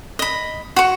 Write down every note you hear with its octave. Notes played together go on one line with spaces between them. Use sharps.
D#5 B5
F#4 C#6